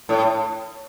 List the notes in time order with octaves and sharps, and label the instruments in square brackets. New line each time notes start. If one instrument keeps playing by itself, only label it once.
[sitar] A2